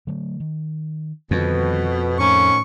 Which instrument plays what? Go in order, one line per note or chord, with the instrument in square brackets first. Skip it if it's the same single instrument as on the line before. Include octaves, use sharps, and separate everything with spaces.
[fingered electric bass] D3 F#3 A3
D#3
[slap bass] F2 [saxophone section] B2 [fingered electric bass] D3 D#3 G3
[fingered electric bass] A2 A3 [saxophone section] D#3 F3 C#4 [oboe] C#6